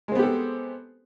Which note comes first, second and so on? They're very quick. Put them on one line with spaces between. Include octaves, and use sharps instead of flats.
G#3 C4 B3 G4 A4